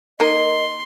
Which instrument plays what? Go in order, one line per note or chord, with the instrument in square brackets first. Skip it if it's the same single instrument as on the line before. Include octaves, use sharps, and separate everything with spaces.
[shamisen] A#3 D#4 A#4 [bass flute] D#5 [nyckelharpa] C6